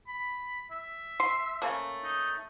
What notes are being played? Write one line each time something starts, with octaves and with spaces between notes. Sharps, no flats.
B5
E5
C6
C#3 A3 A#3
D#4